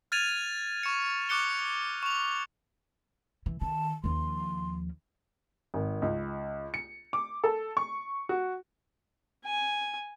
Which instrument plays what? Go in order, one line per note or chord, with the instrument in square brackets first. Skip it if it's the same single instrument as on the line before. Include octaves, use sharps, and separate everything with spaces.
[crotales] F6 G#6 A6 D#7 F7
C#6 C#7
C#6 D6 F#6 C#7 G7
C#6 F7
[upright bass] E3
[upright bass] D#3 [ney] A5
[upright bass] D#2 F3 [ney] C6
[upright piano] G#1
C#2
C#7
D6
A4
C#6
F#4
[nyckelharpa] G#5